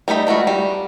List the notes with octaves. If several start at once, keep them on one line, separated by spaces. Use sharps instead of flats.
G3 A3 D#4 B5
G#3 A3 F4 F#4
G3